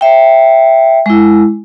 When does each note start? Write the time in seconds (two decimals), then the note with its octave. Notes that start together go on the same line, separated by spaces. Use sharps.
0.01 E5 G5
1.06 G#3 E4